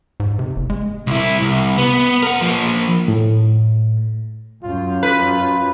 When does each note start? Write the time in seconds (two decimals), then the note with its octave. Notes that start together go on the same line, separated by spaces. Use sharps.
0.20 G#2
0.39 C3
0.56 F#1
0.70 G#3
1.07 C2 E4
1.42 C2
1.77 B3
2.23 A#4 F#5
2.41 F3 A#3
3.08 A2
4.65 F#2 F4
5.03 B4